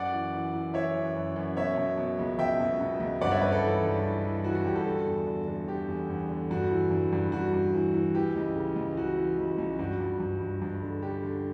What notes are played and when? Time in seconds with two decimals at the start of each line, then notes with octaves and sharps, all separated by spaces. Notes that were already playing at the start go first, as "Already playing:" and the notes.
Already playing: F#2 D5 F#5
0.13 E3
0.34 E3
0.53 E3
0.74 E3 C#5 E5
0.96 F#2
1.15 F#2
1.36 F#2
1.57 B2 C#5 E5
1.77 B2
1.98 B2
2.19 C#2
2.39 C#2 E5 G5
2.60 B2
2.80 B2
3.00 C#2
3.21 G2 D5 F#5
3.31 C#5 E5
3.41 G2 B4 D5
3.52 A4 C#5
3.62 E3
3.83 G2
4.03 E3
4.24 E3
4.44 E3 F#4
4.55 F#4
4.65 G2 G4
4.75 F#4 A4
4.85 D3
5.06 E2
5.27 D3
5.48 D3
5.68 D3 G4
5.88 E2
6.10 E2
6.29 D3
6.51 G2 F#4
6.71 E3
6.91 G2
7.13 G2
7.32 G2 F#4
7.54 G2
7.74 E3
7.94 E3
8.15 E3 G4
8.36 C#2
8.55 C#3
8.76 C#2
8.97 E3 F#4
9.17 E3
9.38 C#2
9.58 C#2
9.79 G2 F#4
10.00 G2
10.20 G2
10.41 G2
10.62 G2
10.82 D3
11.02 D3 G4
11.23 D3